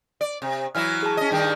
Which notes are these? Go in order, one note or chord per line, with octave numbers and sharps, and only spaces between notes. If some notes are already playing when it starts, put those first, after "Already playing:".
D5
C3
E3 F#3 E4 F6
G#4 A5
C#4 D#5
G2 D#3 G3